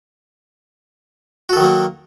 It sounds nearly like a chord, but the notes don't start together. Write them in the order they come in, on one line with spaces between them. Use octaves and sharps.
F#4 A4 D#3 F#3 A#3